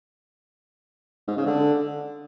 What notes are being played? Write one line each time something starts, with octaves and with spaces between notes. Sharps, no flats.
G#2
C#3
D3